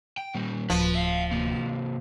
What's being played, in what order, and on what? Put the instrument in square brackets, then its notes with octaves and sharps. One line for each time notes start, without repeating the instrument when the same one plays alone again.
[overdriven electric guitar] G5
A#2 G3
[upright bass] D1 [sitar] F3 [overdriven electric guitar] B4
[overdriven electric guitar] E5 F5
C3 A#3